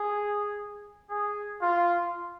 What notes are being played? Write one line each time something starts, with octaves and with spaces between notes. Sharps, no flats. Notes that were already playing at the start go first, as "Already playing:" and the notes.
Already playing: G#4
G#4
F4